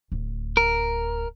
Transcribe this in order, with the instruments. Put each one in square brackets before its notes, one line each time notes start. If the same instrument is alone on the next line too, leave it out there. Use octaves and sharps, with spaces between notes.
[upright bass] D1
[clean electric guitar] A#4